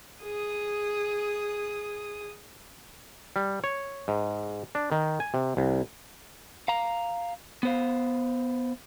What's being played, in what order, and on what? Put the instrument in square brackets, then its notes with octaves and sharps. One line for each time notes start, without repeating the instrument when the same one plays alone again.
[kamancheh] G#4 D#6
[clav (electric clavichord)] G3
C#5
G#2
D4
D#3
G#5
C3
C2
[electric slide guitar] F5 A#5
B3 C5 F5